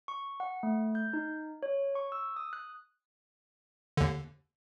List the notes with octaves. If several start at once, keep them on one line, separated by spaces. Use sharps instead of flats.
C#6
F#5
A3
G6
D#4
C#5
C#6
E6
D#6
F#6
D#2 D3